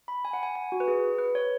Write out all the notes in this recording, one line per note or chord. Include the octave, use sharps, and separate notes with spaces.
B5
G#5
F#5
G#5
G#5
F#4
B4
G#4
B4
C#5